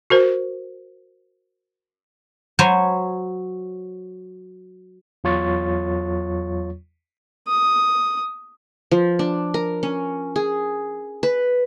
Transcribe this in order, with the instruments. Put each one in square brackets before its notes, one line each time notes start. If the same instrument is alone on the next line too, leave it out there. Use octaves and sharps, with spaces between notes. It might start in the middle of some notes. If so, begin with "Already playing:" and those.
[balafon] F#4 A#4 C5
[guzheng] F#3 C5 C#5 G#5 B5
[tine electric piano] E2 F#3 F4 C#5 C#6 A6
[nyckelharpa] D#6
[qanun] F3
D4
A#4
C#4
G#4
B4